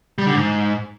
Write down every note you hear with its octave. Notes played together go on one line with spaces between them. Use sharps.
G3
D3
G#2